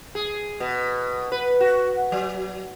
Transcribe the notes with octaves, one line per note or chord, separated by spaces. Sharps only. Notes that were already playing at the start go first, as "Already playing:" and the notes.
G#4
B2
B4
F#4
F#3